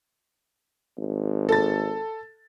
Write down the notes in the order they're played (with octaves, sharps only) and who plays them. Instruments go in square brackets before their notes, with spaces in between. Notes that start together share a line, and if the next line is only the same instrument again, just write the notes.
[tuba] G#1
[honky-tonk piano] A4 A6